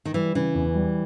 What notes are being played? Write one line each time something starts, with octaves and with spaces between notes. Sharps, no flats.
D#3
E3 G3
C#3 E3
E2
G3